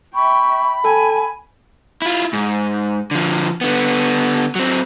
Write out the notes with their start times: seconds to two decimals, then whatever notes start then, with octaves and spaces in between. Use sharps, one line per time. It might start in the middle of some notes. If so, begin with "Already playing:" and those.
0.15 E5 G5 B5 C#6
0.84 A4 G5 G#5
2.02 E4 F4
2.33 G#2
3.11 D3 F3
3.61 D3 B3
4.55 F#3 C4